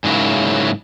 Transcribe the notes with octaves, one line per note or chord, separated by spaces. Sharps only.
G#2 C#3 F#3 A#3 E4